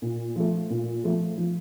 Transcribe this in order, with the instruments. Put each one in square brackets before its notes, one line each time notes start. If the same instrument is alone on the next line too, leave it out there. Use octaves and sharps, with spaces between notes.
[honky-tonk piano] A#2
F3 A3
A#2
F3 A3
F3